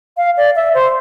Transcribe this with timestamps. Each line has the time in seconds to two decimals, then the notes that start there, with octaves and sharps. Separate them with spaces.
0.17 F5
0.37 D5
0.56 E5
0.74 C5